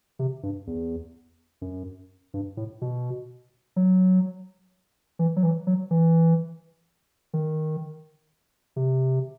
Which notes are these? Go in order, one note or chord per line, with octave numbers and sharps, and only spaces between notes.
C3
G2
E2
F#2
G2
A2
B2
F#3
E3
F#3
E3
F#3
E3
D#3
C3